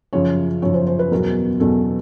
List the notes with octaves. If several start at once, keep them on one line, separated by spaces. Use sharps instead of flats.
F#2 C#3 F3 C#5
F#2 C#3 F3 C#5
C5
C5
B4
E2 B2 F#3 A#4
E2 B2 F#3 A4